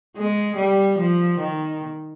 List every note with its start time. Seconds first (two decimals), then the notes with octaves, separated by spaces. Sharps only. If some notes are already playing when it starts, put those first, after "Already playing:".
0.16 G#3
0.57 G3
0.98 F3
1.39 D#3